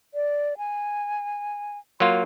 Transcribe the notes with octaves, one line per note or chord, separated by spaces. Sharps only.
D5
G#5
F#3 A#3 F4 C6